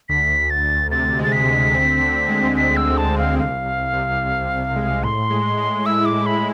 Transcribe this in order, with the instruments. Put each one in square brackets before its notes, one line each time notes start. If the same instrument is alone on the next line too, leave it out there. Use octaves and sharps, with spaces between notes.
[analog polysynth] D2 [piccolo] B6
[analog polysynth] D2
[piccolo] A6
[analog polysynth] D2
[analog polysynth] C3 [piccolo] A6
[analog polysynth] G#3 [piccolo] A6
[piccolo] B6
[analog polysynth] D2
C4
D3
G#3
[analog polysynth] D3 [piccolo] B6
[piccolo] E6
[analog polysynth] G#3
[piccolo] A5
[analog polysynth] D3
[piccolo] F5
[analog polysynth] C2 [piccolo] F5
[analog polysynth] C2
C3
C3
C2
G#3
[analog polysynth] A2 [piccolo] C6
[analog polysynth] G#3
G#3
[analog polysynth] E4 [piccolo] E6
[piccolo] D6
[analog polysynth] A2
[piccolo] B5